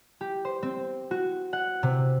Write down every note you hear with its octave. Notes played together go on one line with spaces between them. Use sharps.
G4
C5
C4
F#4
F#5
C3